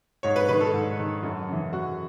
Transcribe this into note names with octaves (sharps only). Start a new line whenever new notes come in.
G#2 C#5
B4
D#3 B4
A4
G#2
D#3
F#2
C#3 E3
F#2 F#4